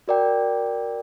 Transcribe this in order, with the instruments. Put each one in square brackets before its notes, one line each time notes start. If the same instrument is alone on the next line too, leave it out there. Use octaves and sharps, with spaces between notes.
[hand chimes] F#4 A#4 D5 G5